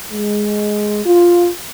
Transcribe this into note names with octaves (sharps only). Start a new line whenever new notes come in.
G#3
F4